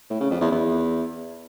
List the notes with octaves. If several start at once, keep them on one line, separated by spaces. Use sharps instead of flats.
A2
C#3
F2
E2
E2